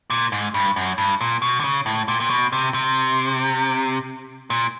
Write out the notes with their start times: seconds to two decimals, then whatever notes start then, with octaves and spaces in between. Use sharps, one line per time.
0.10 A#2
0.32 G#2
0.54 G2
0.76 F#2
0.98 G2
1.21 A#2
1.42 B2
1.60 D3
1.64 C#3
1.86 A2
2.08 A#2
2.20 A#2
2.30 B2
2.52 C3
2.74 C3
4.50 A#2